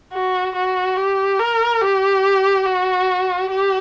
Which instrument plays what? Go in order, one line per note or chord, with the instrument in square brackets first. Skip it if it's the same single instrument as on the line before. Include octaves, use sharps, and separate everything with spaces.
[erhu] F#4
F#4
G4
A#4
G4
F#4
G4